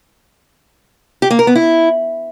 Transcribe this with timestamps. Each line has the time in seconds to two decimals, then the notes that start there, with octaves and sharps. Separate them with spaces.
1.22 G4
1.31 A#3
1.39 A#4
1.47 B3
1.55 E4